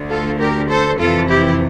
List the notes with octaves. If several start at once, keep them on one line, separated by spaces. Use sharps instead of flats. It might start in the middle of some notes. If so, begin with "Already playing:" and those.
Already playing: D2 D3
F4 A4
G4 A#4
A4 C5
F2 C3 E3 F4 A4
E4 G4